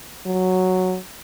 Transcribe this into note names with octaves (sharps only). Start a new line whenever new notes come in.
F#3